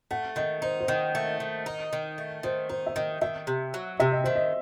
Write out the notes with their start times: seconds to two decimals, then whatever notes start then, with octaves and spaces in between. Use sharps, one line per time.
0.11 A3 F#5
0.36 D#3 D#5
0.62 D#4 C5
0.80 C5
0.88 D#3 D#5
1.15 A3
1.40 D#3
1.66 D#4
1.93 D#3
2.18 A3
2.43 D#3 C5
2.69 D#4 C5
2.87 E5
2.96 D#3 D#5
3.21 D#3 E5
3.47 C3
3.74 F#3
4.00 C3 E5
4.12 D#5
4.24 D#3 C5
4.35 D#5